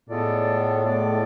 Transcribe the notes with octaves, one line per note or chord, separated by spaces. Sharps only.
A2 G#3 B3 F4 A4 D5
G#3 B3 F4 A4 D5